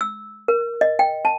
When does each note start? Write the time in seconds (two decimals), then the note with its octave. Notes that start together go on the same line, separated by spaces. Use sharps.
0.01 E6
0.48 A#4
0.81 D#5
0.99 G5
1.25 A5